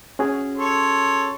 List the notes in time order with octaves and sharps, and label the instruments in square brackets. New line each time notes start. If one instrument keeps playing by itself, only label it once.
[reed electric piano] C#4 F#4 G#4
[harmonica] A4 C#5 C6